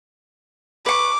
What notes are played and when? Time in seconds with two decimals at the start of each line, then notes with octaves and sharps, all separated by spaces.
0.86 B4 C#6 D6